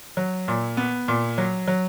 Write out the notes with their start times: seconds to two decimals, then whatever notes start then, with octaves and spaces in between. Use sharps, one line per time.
0.17 F#3
0.48 A#2
0.77 B3
1.08 A#2
1.38 F#3
1.68 F#3